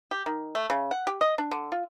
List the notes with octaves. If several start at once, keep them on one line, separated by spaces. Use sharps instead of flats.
G4
D#3
A3
C#3
F#5
G4
D#5
D4
D3
F4